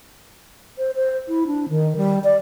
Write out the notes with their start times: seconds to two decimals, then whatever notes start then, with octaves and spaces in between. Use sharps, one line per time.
0.78 C5
0.94 C5
1.28 E4
1.46 D4
1.69 D#3
1.96 G3
2.23 D5